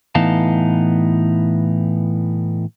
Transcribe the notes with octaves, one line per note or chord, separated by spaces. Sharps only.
A2 E3 B3 D#4 F5 A5